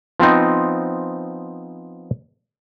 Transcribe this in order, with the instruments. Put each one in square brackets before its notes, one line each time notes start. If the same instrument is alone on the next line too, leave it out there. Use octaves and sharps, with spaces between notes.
[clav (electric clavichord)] F3 B3 C4 D#4